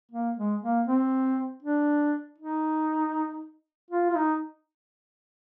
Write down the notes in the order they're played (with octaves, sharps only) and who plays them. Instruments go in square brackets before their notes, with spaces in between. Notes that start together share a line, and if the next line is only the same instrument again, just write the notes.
[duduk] A#3
G#3
A#3
C4
D4
D#4
F4
F4
D#4